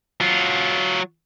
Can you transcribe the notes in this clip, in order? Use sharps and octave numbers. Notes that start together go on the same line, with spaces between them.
F#3 F4